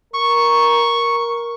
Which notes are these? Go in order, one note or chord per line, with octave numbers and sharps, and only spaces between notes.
A#4 C#6